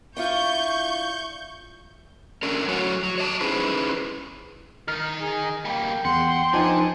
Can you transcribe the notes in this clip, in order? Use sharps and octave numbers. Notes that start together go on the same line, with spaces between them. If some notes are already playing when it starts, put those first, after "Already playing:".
D4 E4 F4 C#6 G6
A3 C#4 D4 A#4
A2 F#3 A3 F#4 C#5 G#5
F#3
C#5 D#5 A5
C#4 D#4 E4 G#4 B4 C5
D#3 D#4 F6
G#4
G3 A#3 G5
E2 F#5 C6
F3 D4 D#4 G#5